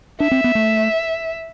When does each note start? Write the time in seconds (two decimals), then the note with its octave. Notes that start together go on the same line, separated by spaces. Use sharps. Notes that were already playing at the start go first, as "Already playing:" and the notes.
0.20 D4 E5
0.31 C4
0.44 B3
0.55 A3